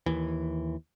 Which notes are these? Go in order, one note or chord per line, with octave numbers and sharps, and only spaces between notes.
D#2 E3